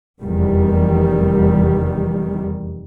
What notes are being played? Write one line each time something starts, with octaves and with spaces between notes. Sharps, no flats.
F1 E2 D#3 G3